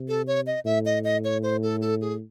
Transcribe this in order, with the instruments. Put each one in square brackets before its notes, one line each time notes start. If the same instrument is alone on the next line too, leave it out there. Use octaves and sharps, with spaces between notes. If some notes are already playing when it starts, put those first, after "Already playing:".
Already playing: [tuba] C3
[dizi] A4
C#5
D#5
[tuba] A2 [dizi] E5
[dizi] D#5
D#5
C#5
C5
A4
A4
G#4